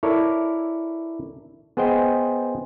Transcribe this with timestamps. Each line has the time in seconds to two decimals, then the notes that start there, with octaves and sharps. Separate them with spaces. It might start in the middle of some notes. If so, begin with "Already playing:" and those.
0.03 E4 A4 A#4 C#5 D5
1.77 B3 G#4 C5 D#5 G5